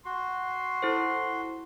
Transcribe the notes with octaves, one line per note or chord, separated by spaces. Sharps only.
F#4 C6
E4 A4 C5